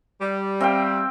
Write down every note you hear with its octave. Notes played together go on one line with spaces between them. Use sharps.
G3
C4 F5 G5